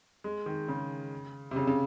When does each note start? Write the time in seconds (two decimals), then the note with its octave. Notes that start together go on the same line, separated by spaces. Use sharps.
0.24 G#3
0.46 D#3
0.68 C#3
1.51 C3
1.56 C#3
1.67 C#3